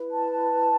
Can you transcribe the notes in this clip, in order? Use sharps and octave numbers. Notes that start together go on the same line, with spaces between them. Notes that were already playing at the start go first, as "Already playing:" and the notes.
Already playing: E4 B4
A5